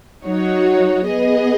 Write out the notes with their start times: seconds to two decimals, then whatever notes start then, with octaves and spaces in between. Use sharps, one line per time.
0.25 F#3 D#4 F#4 C#5
1.06 B3 G#4 D#5